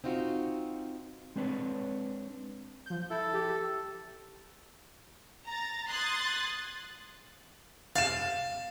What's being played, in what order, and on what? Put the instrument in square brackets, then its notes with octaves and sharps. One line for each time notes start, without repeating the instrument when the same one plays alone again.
[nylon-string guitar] C4 D#4 F4 F#4
[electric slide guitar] G#3 C4 D4 B4 C#5
[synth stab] F3 G6
[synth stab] E4 [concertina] A4
[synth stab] G4
[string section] A#5 A6
C6 D#6 F#6 G#6 A6
[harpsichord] F5 [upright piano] A6 E7